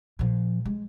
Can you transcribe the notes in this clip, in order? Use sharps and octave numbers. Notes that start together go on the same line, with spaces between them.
A#2 F3
G#3